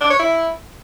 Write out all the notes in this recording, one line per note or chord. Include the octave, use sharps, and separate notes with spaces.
D4
C#5
E4